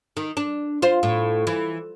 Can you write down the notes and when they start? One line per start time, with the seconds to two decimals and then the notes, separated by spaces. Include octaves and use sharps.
0.17 D#3
0.37 D4
0.82 F4 C5
1.03 A2
1.47 E3